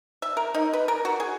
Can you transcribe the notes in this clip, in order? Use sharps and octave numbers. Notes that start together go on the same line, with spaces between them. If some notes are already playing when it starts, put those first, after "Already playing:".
E5
A#4
D#4
B4
A#4
F#4
G#4